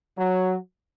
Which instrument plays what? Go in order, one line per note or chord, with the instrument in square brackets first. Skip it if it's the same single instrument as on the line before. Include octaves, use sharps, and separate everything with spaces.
[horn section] F#3